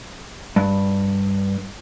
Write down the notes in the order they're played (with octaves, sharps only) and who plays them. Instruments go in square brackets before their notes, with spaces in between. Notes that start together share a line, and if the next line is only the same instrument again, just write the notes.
[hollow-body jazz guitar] G2